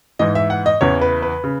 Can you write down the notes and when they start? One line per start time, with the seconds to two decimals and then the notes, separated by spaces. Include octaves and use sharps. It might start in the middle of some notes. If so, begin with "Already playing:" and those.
0.19 G#2 E3 D#5
0.35 E5
0.50 F#5
0.66 D#5
0.81 E2 C#3 E3 C#5
1.01 B4
1.22 B4
1.44 C#3